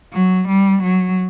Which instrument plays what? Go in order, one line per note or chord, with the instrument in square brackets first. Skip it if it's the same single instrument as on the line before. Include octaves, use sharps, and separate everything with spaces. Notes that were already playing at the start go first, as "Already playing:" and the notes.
[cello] F#3
G3
F#3